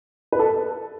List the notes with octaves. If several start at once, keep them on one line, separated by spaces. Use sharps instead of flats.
B4
A4